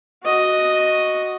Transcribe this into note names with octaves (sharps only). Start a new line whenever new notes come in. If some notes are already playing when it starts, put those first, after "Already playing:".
F#4 D#5